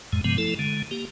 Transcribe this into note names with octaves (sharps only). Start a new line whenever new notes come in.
F2 A2 G#3
G2 C3 F3 G#3 B3
F3 A3 E4 A4
D3 G#3
A#3 G4